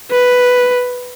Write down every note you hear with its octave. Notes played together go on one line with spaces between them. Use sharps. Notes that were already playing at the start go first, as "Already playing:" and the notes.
B4